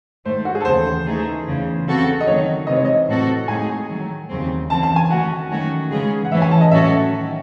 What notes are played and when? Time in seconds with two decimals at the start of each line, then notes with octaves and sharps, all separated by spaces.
0.25 G#2 D#3 A3 C5
0.45 F#4
0.55 G#4
0.60 A4
0.65 D#2 C#3 E3 C5
1.06 E3 A3 D#4 G#4
1.46 E2 C#3 E3
1.87 C#3 F#3 C4 F#4 A4
2.21 D#5
2.27 D#3 F#3 A3 C#5
2.67 C3 E3 G#3 D#5
2.76 C#5
2.85 D#5
3.07 A2 F#3 C4 F#4 A4
3.48 A2 G#3 D#4 G#4 G#5
3.88 D#3 F#3 A3
4.29 D#2 C#3 F#3 C4
4.69 C#3 E3 C4 A5
4.83 A5
4.96 G#5
5.09 D#3 A3 C#4 F#4 F#5
5.50 D#3 F#3 A3 C#4 F#4
5.91 C#3 E3 G#3 C#4 G#4
6.25 F#5
6.31 G#2 E3 A3 C#4 E4 E5
6.42 G#5
6.51 A5
6.61 D#5
6.71 A2 F#3 C#4 F#4 A4 E5
7.12 D#3